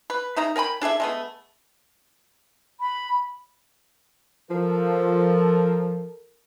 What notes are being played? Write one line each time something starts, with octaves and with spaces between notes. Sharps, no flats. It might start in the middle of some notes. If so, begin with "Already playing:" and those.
B4
C#3 D#4 E5 A#5
A#4 G5 G#5 B5
D4 G#4 A4 E5
G#3 A3 B3
B5
F3 A4 A#4